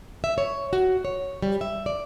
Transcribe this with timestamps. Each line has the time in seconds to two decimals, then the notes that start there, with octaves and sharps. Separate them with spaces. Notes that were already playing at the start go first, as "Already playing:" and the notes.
0.24 E5
0.38 C#5
0.73 F#4
1.05 C#5
1.43 G3
1.61 E5
1.86 D5